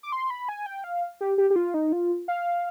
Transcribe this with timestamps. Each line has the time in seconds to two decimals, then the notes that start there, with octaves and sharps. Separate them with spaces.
0.03 D6
0.12 C6
0.30 B5
0.49 G#5
0.66 G5
0.84 F5
1.21 G4
1.38 G4
1.50 G4
1.56 F4
1.74 D#4
1.92 F4
2.28 F5